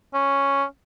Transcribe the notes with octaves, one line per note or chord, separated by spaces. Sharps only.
C#4